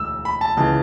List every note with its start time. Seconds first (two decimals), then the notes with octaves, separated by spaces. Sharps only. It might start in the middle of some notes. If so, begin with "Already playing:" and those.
Already playing: E1 D2 G#3 E6
0.25 B5
0.41 A5
0.57 C#2 C#3 E3 A5